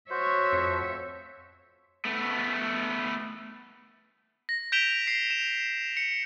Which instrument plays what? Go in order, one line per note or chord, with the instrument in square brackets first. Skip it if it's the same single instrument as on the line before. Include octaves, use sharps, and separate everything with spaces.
[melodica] F#4 C5 [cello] C#5 E5
[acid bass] F2
[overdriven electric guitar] A3 B3
[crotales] A#6
G6 B6 D7 E7 F7 G7
C7
E7
C#7